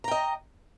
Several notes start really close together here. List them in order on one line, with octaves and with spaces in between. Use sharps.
A#5 G5 D#5